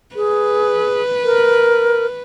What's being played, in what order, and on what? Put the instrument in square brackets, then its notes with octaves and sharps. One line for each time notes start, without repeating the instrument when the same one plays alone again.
[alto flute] G#4 [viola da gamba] B4
[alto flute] A#4